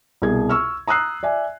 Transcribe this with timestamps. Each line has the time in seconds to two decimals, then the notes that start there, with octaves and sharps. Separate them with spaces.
0.22 C2 B2 G#4 G#6
0.49 C#6 E6 F6
0.88 A#5 D#6 E6 F#6 C7
1.23 D5 E5 G#5